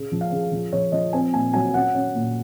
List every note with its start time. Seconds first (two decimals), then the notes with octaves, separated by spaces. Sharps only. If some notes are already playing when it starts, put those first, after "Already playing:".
Already playing: C#3
0.12 F3
0.21 F5
0.32 C#3
0.52 F3
0.73 F3 C#5
0.92 F3 D#5
1.13 C4 G#5
1.33 A#2 G#5
1.53 F#3 G#5
1.74 C#4 F#5
1.94 C#4
2.15 A#2